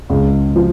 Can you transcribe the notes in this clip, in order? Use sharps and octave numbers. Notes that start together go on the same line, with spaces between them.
C#2
F3